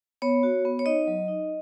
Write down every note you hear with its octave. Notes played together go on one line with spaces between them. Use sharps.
B3 C#5
F#4
B3
C#5
D#4 D#5
F#3
D#4